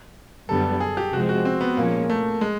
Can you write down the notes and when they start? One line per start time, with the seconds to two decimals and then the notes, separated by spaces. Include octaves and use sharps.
0.49 F#2 D3 G3 B3 A4
0.80 G#4
0.97 G4
1.13 C3 F3 G#3 C4 F#4
1.29 F#4
1.45 C4
1.61 B3
1.77 A#2 F3 G#3 A#3 C#4
2.10 A3
2.41 G#3